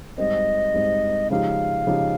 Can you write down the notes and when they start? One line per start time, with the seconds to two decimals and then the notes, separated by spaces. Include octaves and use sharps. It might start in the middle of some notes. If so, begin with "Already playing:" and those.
0.18 G#2 G3 C4 D#5
0.74 G#2 G3 C4
1.30 C#3 F3 G#3 D#4 G4 F5
1.87 C#3 F3 G#3 D#4 G4